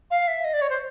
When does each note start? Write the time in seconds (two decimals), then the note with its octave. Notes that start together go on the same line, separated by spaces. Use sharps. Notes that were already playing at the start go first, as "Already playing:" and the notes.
0.11 F5
0.28 E5
0.44 D#5
0.53 D5
0.62 C#5
0.70 C5